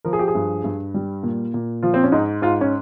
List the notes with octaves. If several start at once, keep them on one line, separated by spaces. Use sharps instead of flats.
F3 A#4
G#4
G4
G#4
G2
G2
G3
A#2
A#2
F3 F4
C4
C#4
G#2 D#4
G#2 F4
C#4